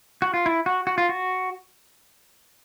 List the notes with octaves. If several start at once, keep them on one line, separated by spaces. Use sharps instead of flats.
F#4
F4
E4
F#4
F#4
F4
F#4